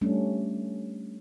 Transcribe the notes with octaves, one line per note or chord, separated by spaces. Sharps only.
G3 A3 C#4 D4